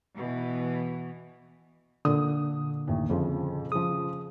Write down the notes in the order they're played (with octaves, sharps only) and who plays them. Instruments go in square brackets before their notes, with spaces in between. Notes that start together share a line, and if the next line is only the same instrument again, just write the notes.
[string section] B2 E3
[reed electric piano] A#2 D3 [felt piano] D#6
[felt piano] A1 D#2
F2 C#3 F3
[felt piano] C#3 F3 [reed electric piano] D#6